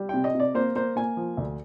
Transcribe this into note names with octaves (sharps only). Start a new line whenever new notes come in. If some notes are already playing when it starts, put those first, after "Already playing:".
Already playing: G3
C3 G5
D#5
C3 D5
A#3 C5
A#3 C5
A#3 G#5
F3
D2